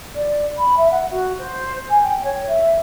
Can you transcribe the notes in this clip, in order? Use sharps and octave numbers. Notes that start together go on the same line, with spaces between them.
D5
B5
E5
F#5
F#4
C5
G#5
G5
C#5
E5